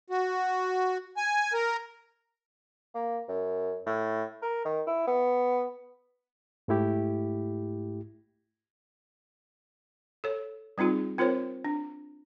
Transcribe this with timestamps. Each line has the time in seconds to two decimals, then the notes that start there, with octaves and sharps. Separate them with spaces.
0.10 F#4
1.17 G#5
1.53 A#4
2.95 A#3
3.28 F#2
3.87 A2
4.42 A#4
4.65 D#3
4.87 E4
5.07 B3
6.68 G#2 A3 E4 G4
10.24 A4 C#5
10.78 G3 C4 D#4 F4 G#4
11.18 C4 F4 A#4 C5 C#5
11.65 D4